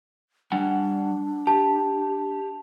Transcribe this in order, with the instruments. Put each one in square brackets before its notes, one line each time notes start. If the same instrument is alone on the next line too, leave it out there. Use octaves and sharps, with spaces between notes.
[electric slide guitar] G3 F#5 G#5 [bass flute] D4
[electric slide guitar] G4 [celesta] A5